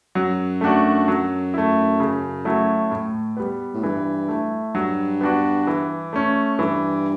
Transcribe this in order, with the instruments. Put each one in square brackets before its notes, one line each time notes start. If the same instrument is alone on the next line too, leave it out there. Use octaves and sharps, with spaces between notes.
[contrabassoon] F#2 [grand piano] F#3
[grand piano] A3 D4 F#4
F#3
A3 E4
C#3
F#3 A3 C#4 E4
A2
G3 B3
[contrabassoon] A2
[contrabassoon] G2 [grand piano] E3
[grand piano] A3 E4
[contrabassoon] G2 [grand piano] F#3
[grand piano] B3 D4 F#4
E3
A3 C#4
[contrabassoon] G2 [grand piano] E3